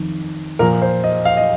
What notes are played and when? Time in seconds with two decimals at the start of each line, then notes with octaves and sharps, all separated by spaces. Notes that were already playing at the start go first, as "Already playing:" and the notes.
Already playing: F2 D#3
0.59 A#2 F3 A#4
0.82 C5
1.04 D#5
1.25 F5
1.37 D#5